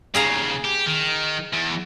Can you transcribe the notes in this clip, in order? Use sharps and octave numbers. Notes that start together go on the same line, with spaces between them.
D#2 C#3 G#4 F5 A#5
G4
D#3
E2